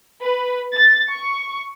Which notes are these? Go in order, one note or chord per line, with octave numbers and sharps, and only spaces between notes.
B4
A6
C#6